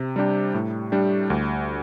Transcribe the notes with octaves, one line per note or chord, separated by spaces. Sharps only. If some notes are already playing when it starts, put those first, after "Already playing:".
Already playing: C3
G3 D4 G4
A2
G3 D4 G4
D2